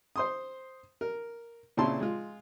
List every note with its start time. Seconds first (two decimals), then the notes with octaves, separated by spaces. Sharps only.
0.16 C5 C6 D#6
1.01 A#4
1.77 A#2 C#3 C4 E4 A5 C6
2.00 G#3 F4